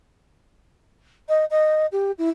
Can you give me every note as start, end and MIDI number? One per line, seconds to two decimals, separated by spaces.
1.28 1.45 75
1.50 1.86 75
1.92 2.11 67
2.18 2.29 64